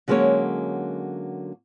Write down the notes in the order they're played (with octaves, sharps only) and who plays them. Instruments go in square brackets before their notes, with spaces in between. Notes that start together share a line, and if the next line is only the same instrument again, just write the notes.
[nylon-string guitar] D3 F#3 G#3 A#3 C#4 C#5